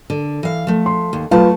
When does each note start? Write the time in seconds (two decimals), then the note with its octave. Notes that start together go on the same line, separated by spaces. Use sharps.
0.10 D3
0.43 E3 F5
0.67 F3 A3
0.86 C6
1.13 D#2
1.31 F#3 A3 F4 B4 F5 A5